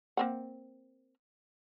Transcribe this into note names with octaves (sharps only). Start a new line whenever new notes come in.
A#3 C4 F#5